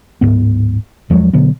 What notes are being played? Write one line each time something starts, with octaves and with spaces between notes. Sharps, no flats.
D1 E2 G#2 B3
E2 F3 F#3 G#3
B2 D3 F#3 B3